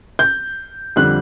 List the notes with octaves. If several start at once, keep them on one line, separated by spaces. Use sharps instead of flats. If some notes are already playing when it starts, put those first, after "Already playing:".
G6
F2 D3 G3 F#6